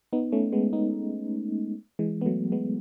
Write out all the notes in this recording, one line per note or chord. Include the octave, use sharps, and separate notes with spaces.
B3 D#4
A3 C#4
G#3 B3
B3 D#4
E3 G#3
B3
F#3 A3
G#3 B3